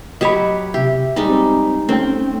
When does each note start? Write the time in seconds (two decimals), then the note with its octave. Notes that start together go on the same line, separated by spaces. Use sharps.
0.21 F#3 G4 C#5 D#5 B5
0.74 C3 G4 E5
1.16 G3 G#3 D#4
1.30 C4
1.89 A3 C4 C#4 G5